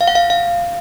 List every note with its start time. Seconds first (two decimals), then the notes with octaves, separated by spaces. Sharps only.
0.01 F5
0.08 F#5
0.15 F5
0.30 F5